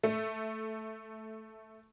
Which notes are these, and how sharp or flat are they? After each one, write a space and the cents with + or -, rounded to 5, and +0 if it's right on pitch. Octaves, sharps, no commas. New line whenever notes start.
A3 +0